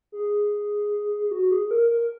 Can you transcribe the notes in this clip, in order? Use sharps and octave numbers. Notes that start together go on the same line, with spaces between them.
G#4
F#4
G#4
G#4
A#4
A#4